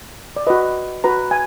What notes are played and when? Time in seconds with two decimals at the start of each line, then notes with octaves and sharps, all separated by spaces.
0.36 D5
0.47 F#4 B4 D#5
1.04 F#4 B4 A#5
1.31 G#5